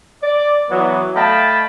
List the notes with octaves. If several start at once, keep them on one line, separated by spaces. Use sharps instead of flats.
D5
E3 F#3 B3
A3 D#5 F5 G5 A5 B5